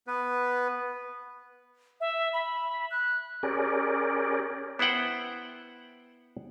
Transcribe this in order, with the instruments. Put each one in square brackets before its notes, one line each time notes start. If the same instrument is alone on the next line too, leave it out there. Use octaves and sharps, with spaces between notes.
[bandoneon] B3 B4
[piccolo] E5
B5
F#6
[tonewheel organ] C#4 G4 G#4 A#4 D5
[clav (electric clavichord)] B3 E4 C5 F#5 G5